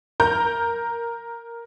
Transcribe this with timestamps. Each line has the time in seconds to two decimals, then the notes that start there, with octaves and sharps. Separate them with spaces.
0.20 A#4 A#5 G6